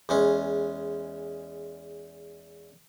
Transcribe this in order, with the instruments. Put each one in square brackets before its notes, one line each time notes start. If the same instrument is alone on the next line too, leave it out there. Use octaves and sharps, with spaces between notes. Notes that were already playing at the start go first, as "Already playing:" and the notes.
[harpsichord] E2 G#3 C#4